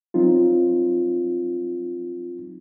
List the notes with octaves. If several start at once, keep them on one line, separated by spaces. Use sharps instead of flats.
F#3 C4 D#4 F4